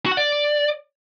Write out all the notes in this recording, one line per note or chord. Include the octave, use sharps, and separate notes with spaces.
F#4
F#5
D5